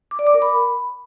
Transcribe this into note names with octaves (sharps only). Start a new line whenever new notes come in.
D6
D5
D6
A#4
B5